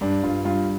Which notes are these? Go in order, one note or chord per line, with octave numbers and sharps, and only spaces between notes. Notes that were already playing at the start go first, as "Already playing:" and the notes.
G2 D4
G2 F4
G2 F4